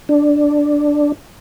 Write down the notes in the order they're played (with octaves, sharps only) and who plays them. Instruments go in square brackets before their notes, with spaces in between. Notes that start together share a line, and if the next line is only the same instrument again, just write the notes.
[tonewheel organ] D4